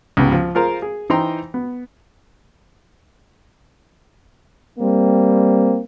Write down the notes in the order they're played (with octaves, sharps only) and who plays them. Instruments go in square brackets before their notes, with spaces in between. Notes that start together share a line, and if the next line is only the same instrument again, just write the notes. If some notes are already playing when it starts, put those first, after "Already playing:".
[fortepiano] C#2 G#2 B3 G4 G5
F3
F4 G#4 A#4 C5 F5
G#4
E3 D#4 C5 G5 A#5 C6
B3
[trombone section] G3 A#3 C4